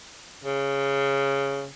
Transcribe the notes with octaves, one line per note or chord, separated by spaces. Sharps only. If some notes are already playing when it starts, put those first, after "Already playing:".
C#3